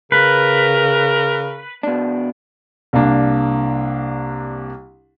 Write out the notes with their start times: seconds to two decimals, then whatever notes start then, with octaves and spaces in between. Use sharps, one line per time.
0.12 C#3 A#4 B4
1.83 B2 D4
2.93 C2 A#3 D4